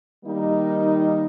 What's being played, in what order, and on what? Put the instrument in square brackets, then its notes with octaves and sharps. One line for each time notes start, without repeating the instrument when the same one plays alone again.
[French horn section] D#3 G3 A#3 D#4